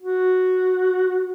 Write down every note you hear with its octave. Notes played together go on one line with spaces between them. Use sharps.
F#4